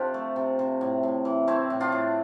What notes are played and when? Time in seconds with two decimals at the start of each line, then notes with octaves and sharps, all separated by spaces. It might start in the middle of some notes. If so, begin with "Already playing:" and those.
Already playing: C3 F3 D4 F4 G4 A4
0.14 A3
0.36 C3
0.59 C3
0.81 A2
1.03 A2
1.25 E3
1.47 A3 C4 E4
1.70 A2
1.80 D4 F4
1.92 A2